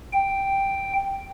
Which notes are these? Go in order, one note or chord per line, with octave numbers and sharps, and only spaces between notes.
G5